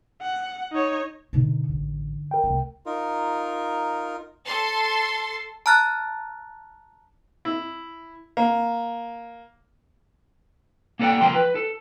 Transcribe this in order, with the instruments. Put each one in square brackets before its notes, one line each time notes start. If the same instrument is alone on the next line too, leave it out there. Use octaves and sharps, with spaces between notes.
[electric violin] F#5
D#4 C#5
[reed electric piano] G2 D3 D#3 [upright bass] B2 D#4
[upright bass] A1
[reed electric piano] A#4 G5
[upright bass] C2 A3
[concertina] D#4 F4 A#4
[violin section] A4 C6 A6
[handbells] A5 A#5 F6 F#6 A6
[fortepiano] E4
A#3
[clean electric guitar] A#3 B3 A4 D5 F#5 G5
C#2 F3 A#4 G5 C6
B4
A4